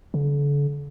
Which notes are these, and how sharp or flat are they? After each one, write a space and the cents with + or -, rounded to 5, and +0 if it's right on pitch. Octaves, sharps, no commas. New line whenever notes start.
D3 -40